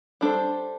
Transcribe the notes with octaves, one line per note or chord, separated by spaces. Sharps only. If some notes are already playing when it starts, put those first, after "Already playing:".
G3 D4 A4 C5